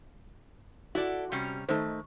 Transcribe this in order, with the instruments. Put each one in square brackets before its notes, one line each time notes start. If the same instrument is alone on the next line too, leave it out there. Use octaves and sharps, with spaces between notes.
[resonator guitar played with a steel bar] E4 A4 D5 [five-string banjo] F#4
[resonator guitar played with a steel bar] C3 G3 C#4
[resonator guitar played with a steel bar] D#3 [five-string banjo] A3 D#4 C5